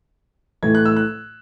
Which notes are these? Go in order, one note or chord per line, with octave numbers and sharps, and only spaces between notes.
A2 E3 A3 G#6
F#6
E6
F#6